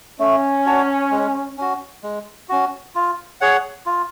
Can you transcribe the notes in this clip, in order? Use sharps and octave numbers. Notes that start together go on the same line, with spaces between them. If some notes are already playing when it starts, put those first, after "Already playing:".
A3 C#4
D4 F#4 C#5
G#3
C#4 F#4
G#3
C#4 F#4
F4
G#4 C#5 F#5
F4